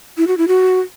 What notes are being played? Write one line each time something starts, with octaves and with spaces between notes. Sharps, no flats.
E4
F#4
E4
F#4